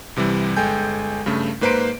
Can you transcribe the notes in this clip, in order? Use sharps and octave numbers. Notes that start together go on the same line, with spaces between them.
C2 C3 E3 G3
G1 G#3 A4 G5 G#5 G6
G2 C#3 A3
G#2 A#3 B4 C5 A#5 D7